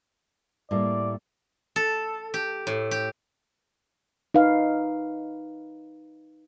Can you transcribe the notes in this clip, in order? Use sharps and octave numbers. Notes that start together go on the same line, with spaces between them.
A2 G3 A#3 D5
A4
G4
A2
G4
D#4 B4 F5